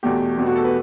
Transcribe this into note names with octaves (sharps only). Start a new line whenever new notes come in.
E2 B2 A3 G4
E2 B2 A3 G4
F#4
A4
B4